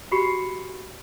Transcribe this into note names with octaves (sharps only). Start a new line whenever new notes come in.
F#4 G4 B5 C#6 C7 C#7